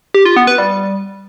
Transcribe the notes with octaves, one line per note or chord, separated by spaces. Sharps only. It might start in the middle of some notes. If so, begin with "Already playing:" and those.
G4
F4
B3
B4
G3